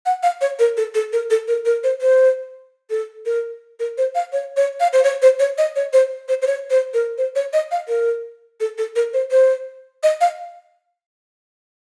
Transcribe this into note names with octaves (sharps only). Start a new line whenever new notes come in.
F#5
F5
C#5
A#4
A4
A4
A#4
A4
A#4
A#4
C5
C5
A4
A#4
A#4
C5
F5
C#5
C#5
F5
C5
C#5
C5
C#5
D#5
C#5
C5
C5
C5
C#5
C5
A#4
C5
C#5
D#5
F5
A#4
A4
A4
A#4
C5
C5
D#5
F5